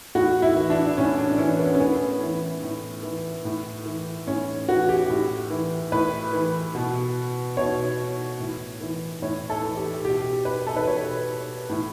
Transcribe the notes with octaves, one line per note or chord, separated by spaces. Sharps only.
A2 F#4
E4
E3
D4
A2 C#4
D4
E3 C#4
B3
C#4
A2 B3
E3
A2
E3
A2
E3
A2 C#4
E3 F#4
G4
A2
E3
A2 B4
E3
B2
B2 C#5
A2
E3
A2 C#5
A4
E3
G4
B2 G4
B4
A4
B4
B2 C#5
A2